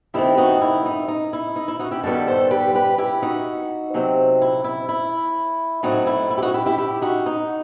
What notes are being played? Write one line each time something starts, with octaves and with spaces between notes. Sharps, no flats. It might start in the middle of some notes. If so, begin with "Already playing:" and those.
G2 D#3 A3 C4 E4 G4
D#4 F#4
E4
D#4
D#4
E4
D#4
E4
D#4 F#4
E4 G4
G2 D#3 G3 B3 F#4 A4
A4 C5
G4 B4
G4 B4
E4 G4
D#4 F#4
C3 F#3 C4
E4
E4
E4
A2 F#3 C4 D#4 F#4
E4
E4
G4
D#4 F#4
E4 G4
E4 G4
E4 G4
D#4 F#4
D#4